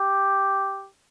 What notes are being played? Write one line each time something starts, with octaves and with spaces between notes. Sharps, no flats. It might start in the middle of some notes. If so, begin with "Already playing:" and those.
Already playing: G4